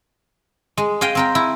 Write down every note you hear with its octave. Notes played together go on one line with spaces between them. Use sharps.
G#3
G#4 D#5 F5 G5
C4 A#4 G5
E4